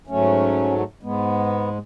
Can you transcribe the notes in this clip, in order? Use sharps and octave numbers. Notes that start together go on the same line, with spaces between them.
G#2 F#3 A3 C#4
G#2 G#3 B3